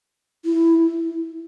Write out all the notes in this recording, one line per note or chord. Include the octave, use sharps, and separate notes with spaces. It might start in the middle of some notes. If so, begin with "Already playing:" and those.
E4